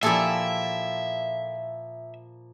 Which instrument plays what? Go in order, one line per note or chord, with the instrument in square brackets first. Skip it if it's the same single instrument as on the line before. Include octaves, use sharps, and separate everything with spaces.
[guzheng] A#2 F3 E4 [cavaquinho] G4 A4 G#5 [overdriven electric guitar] E5